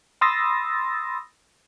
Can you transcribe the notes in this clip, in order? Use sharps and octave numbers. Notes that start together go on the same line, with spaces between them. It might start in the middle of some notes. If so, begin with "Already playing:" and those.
B5 C6 D#6 E6 A6 A#6